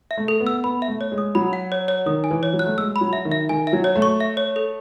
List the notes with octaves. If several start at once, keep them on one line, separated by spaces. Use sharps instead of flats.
E5
A3
A4
B3
E6
B3 B5
E5
A3
C#5
G#3
D#6
F#3 B5
F#5
C#5
C#5
D#3 D#6
G#5
E3
C#5
F#3
F#6
A3
G#3 E6
B5
F#3
E5
D#3
E5
D#3 G#5
E5
F#3
C#5
A3
C#6
E5
C#5
A4